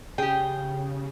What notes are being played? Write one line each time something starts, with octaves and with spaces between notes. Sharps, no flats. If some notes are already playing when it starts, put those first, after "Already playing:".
C#3 G4 G#4 G5